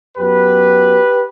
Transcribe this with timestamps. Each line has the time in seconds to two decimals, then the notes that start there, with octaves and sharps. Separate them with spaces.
0.17 F#2 F#3 B3 G4 B4